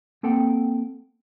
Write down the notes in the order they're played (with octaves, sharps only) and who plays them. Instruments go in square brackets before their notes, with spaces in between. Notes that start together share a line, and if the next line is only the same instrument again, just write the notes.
[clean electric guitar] A#3 C4 A4 F#5 G5